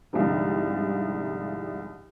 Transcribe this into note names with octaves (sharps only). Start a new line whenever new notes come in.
C2 G#2 D3 F3 G3